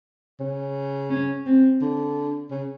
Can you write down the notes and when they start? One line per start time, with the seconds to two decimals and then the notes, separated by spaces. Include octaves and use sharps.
0.40 C#3
1.10 C#4
1.46 C4
1.81 D3
2.51 C#3